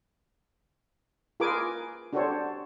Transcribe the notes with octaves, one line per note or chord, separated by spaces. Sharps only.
F4 G#4 A#4 B4 G#5 D6
D4 F#4 G4 A4 C5 C#5